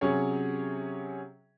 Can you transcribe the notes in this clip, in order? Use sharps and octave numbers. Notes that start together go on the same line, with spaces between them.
C3 F#3 C#4 G#4 C#5